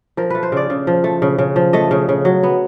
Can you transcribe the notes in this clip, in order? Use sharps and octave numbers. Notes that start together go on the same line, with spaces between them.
F3 A#4
A3 B4
C5
C#3 D5
C#3
F3
A3
C#3
C#3
F3
A3 D#5
C#3
C#3
F#3
B3